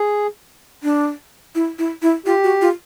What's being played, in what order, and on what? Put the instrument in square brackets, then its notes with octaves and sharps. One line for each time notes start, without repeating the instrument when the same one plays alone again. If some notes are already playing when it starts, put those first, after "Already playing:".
Already playing: [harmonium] G#4
[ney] D4
E4
E4
E4
[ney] F4 [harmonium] G4
[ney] F#4
F4